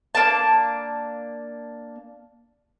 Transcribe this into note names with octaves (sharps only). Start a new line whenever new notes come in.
A#3 D4 A5